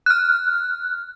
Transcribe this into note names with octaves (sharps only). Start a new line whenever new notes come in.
F6 F#6